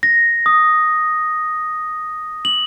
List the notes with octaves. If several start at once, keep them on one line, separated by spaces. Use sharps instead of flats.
A#6
D#6
F#7